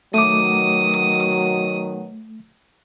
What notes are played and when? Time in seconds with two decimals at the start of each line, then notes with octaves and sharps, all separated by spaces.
0.14 B2 D#3 F#3 A3 D6 D#6